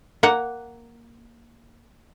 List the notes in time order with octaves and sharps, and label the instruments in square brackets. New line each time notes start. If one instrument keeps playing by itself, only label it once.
[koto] A#3 F#5